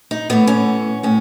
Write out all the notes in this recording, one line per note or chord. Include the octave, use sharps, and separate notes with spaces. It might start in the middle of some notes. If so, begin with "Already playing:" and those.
D#4
A2 E3 B3
C#4
A2 C#4